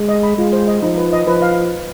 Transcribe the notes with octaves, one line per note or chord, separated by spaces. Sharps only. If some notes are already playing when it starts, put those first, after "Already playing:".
Already playing: G#3
D#5
B5
G#3 F4
C5
D#5
F3 D#4
B4
D#5
F3 B4
F5